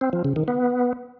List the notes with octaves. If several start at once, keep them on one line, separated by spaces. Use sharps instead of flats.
C4
F3
C#3
D#3
B3